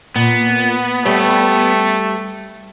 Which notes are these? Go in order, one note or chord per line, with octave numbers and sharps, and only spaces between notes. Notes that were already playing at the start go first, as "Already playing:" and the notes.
A#2 B3
G3 A3 G4 C#5